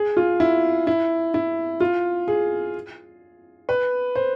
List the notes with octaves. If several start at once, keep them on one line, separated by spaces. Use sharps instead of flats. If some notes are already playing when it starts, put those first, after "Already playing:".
Already playing: G#4
F4
E4
E4
E4
F4
G#4
B4
C5